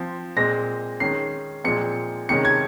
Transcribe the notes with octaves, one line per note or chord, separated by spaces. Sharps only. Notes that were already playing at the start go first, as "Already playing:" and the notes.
Already playing: F3 C4
A#2 G#3 C4 A#6
D#3 G#3 C#4 C7
A#2 F3 G#3 C4 C#7
C3 D#3 G#3 C#4 C#7
G#6